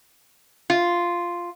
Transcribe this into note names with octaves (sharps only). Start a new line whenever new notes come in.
F4